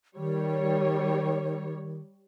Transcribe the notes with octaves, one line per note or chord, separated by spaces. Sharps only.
D#3 G3 C#5